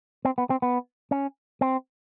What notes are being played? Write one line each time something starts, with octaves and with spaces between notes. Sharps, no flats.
C4
B3
C4
B3
C#4
C4